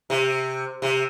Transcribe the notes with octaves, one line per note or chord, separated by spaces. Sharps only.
C3
C3